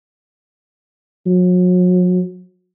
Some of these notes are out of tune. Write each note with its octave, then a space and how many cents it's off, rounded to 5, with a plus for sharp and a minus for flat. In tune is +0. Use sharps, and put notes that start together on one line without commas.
F#3 -40